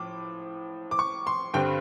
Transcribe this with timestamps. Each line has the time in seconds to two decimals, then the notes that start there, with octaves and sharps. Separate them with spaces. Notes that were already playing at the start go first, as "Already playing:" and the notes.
Already playing: A2 F3 D6
0.91 D6
0.99 C#6
1.27 C6
1.54 G2 D3 G3 C4 G5